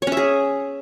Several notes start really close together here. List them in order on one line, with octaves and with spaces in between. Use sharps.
C#5 C#4 E5 G#4